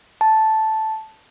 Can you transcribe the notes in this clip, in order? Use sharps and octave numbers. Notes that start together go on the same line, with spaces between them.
A5